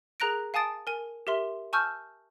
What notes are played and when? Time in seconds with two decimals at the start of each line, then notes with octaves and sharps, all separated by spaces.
0.20 G#4 A#4 A#5 F#6 A#6 D7
0.54 F5 G#5 A5 D#6 A6 D7
0.87 A#4 G#5
1.27 G4 A#4 E5 C6
1.73 G#5 A5 C#6 E6 F6 G6